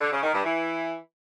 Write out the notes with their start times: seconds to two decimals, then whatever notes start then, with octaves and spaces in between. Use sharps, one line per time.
0.01 D3
0.11 C#3
0.22 D#3
0.33 G2
0.44 E3